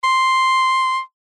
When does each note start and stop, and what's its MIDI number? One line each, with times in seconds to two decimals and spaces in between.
0.04 0.99 84